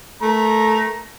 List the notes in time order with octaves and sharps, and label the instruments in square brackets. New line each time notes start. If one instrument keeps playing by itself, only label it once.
[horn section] A3 A#4 A#5